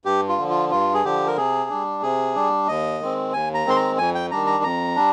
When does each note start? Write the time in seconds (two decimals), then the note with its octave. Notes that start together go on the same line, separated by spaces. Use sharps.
0.05 G2 G4
0.28 F4
0.38 D3 F3
0.50 F4
0.71 G2 F4
0.94 G#4
1.04 D3 F3 G4
1.27 A#4
1.36 C3 G#4
1.70 G3 D4
2.03 C3 G#4
2.35 G3 D4
2.67 D#2 D#5
3.00 D#3 G#3 C4
3.33 D#2 G#5
3.54 A#5
3.66 D#3 G#3 C4 C6
3.76 A#5
3.98 F2 G#5
4.15 G5
4.31 D#3 G3 D4 A#5
4.47 A#5
4.64 F2 A#5
4.96 G3 D4